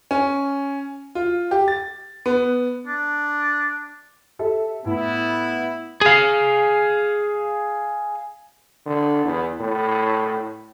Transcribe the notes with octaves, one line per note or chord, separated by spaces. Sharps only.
C#4
F4
G4
A6
B3
D4
G4 A4 E5
A2 B3 E4
G#4 F5
D3
E2
A2